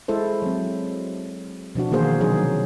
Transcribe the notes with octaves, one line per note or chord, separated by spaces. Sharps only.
G#3 E4 A4 C5
F#3 C4
B2 F3 D4 F#4
D#3 E3 A#3 F#4 G#4 C5
C3 F#3 D4 D#4 G#4